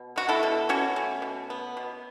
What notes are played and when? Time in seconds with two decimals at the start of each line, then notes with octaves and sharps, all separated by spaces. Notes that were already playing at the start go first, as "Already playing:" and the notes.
Already playing: B2
0.16 B3 F#4
0.29 E4 A4
0.43 B2
0.69 B2 C#4 F#4
0.96 A3
1.22 B2
1.50 B3
1.77 B2